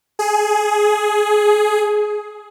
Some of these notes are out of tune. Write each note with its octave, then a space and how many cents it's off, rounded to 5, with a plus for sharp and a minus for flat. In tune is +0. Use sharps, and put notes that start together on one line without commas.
G#4 +15